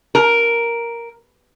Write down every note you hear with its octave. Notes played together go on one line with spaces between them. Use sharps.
A#4